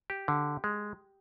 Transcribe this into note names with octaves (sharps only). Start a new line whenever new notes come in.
G4
D3
G#3